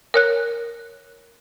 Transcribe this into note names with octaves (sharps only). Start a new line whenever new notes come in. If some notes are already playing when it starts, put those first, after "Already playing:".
A#4 C#5 F#6